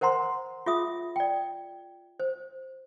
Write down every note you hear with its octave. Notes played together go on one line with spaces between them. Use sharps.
A#4 C5 F#5 A#5 C6
F4 G#4 E5 D#6
D5 G5
C5